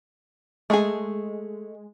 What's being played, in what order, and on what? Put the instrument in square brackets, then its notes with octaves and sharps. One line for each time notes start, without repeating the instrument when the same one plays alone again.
[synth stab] G#3 [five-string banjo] A3 G#4